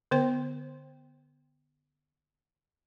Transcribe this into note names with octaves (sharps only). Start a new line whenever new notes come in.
D3 B3 C5 G5 C6